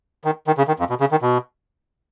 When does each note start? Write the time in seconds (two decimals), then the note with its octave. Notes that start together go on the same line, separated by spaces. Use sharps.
0.24 D#3
0.47 D#3
0.58 C#3
0.68 D#3
0.79 F2
0.90 B2
1.00 C#3
1.11 D#3
1.22 B2